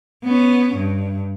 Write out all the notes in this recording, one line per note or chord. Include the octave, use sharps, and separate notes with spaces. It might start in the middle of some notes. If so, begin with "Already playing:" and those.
B3 C#4
G2